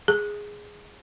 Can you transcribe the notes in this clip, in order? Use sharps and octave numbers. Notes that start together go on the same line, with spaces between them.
G#4